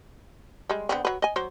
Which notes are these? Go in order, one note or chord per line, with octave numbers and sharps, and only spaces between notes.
G3 G#3
D3 B3 C4
F#3 B4
D#5 G#5
F#3 C5